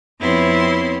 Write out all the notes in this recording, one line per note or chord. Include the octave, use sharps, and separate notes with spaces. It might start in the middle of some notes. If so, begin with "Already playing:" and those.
F2 B3 C4 E4 C#5 C6